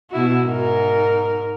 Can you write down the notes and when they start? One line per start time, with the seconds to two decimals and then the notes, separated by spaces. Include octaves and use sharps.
0.11 B2 E4 F#4
0.45 G#2 D#4 A#4